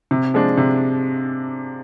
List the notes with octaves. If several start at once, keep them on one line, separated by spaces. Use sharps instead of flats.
C3
F3 G#3 D4
C3